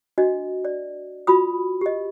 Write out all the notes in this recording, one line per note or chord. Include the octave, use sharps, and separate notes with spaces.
D4 F#4 D#5
D5
F4 F#4 B5 D#6
G4 D#5